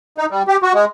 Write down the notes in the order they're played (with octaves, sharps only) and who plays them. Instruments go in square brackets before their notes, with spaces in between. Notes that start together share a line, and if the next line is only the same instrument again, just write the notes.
[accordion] D#4
G3
G4
F#4
G#3